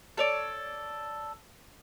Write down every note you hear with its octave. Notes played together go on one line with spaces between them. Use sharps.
A4 C#5 D5